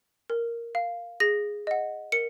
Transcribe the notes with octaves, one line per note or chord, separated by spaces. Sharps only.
A#4
F5
G#4 A#6
D#5 F#5
A#4 C#7